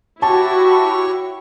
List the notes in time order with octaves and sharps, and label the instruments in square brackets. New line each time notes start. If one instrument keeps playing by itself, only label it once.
[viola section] E4 F#4 [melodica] G4 C#5 C#6 [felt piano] A5